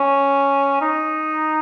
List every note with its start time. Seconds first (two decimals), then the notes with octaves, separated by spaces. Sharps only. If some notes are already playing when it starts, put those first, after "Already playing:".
Already playing: C#4
0.82 D#4